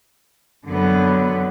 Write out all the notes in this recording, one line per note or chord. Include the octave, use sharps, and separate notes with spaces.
F#2 D3 F#3 B3